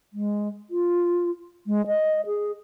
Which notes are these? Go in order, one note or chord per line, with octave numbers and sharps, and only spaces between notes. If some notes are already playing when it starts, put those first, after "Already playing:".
G#3
F4
G#3
D#5
G#4